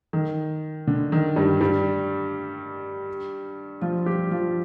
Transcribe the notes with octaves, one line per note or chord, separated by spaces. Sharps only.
D#3
D3
D#3
G2 G3
G2 G3
F3 F4
G3 G4
F3 F4